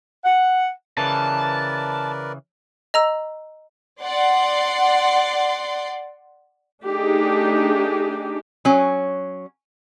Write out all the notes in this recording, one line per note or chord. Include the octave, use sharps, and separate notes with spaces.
F#5
C#3 E3 A#4 B4 D5 A5
D#5 A#5 E6
D5 F#5 C6
A3 D4 D#4 G4 G#4
F#3 C#4